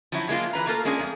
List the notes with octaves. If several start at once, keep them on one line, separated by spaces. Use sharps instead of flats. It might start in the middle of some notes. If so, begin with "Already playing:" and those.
F3 F#3 E4
F#3 G#3 A#3 F4
E3 B4 A#5
A3 A#3 F4 A4 A#4
G#3 A#3 C#4 D4 G#4
F2 A3